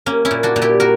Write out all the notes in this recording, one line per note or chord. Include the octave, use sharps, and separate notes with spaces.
A#3 C#4
C#4 E4
A#2
D4 F#4
A#2
E4 G4
F#4 A#4